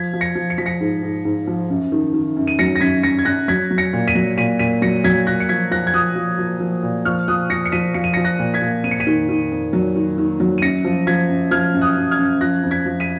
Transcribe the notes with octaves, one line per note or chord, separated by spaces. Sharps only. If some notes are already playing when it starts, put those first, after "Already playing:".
Already playing: F3 G#6 B6
F3
A#6 C#7
F3
C#7
F3 B6
A#6 C#7
G#2
G#2
G#2
F3
F#2
D#3
D#3
F#2
D#7
F#3 A#6 C#7
A#6
F#2 G#6 B6
F#2 A#6 C#7
G#6
F#2 F#6 A#6
F#3 G#6 B6
F#3
A#6 C#7
A#2
B6 D#7
F#3
A#2 B6 D#7
A#2 B6 D#7
F#3 A#6 C#7
F#3 G#6 B6
A#2 F#6 A#6
C#7
F3 G#6 B6
F3 F#6 A#6
G#6
F3 D#6 F#6
F3
F3
F3
A#2
F3 C#6 F6
F3 D#6 F#6
F3 A#6 C#7
C#7
F3 B6 D#7
F3 C#7
D#7
F3 A#6 C#7
F#6 A#6
A#2
G#6 B6
A#2
F2 D#7
C#7
B6 D#7
D#3
D#3
F2
F#3
D#3
D#3
F#3
D#7
F#2 A#6 C#7
F3
F3 G#6 B6
F#2
F3 F6 G#6
F#2
D#6 F#6
F#2
F6 G#6
F#2
F3 F#6 A#6
F2
G#6 B6
F3
B6 D#7